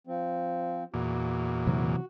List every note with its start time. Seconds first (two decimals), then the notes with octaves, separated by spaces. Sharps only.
0.07 F3 C4
0.94 E2 A#2 F#4
1.67 C3 E3 F#3